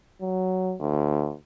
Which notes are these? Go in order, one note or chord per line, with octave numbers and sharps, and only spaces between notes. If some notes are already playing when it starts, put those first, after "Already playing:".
F#3
D2